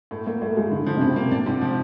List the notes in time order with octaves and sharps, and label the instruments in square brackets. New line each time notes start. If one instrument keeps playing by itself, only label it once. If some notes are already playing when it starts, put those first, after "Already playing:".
[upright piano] A2 [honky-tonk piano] A3
[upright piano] A2 [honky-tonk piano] A#3
[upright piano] A2 [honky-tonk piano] A3
[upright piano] A2 [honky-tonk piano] G#3
[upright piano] A2 [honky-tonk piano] D3
[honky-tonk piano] D3 [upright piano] F3
[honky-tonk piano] C3
[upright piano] A2 [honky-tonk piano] C#3
[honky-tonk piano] B2 [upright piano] A#3
[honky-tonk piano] A#2 [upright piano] D4
[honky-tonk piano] G#2 [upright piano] C3
[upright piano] F3